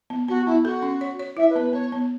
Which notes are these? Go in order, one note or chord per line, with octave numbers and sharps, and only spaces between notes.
B3
B3 F#4
B3 E4
F#4 A4
C#4
C#5
C#5
E4 E5
B4
B3
B4
B3 C#5
B3